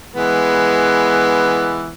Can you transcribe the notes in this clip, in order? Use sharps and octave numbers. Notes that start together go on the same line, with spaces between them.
E3 G#3 B3